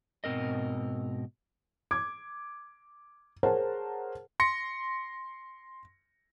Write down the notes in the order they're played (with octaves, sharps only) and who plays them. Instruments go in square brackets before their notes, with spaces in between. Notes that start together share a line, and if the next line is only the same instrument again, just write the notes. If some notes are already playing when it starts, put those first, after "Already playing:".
[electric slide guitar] G#2 B2 C4 A#4 D#5
[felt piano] D6 G#6
G#4 A#4 C5 C#5 F#5 A5
[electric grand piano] C6 A#6 C#7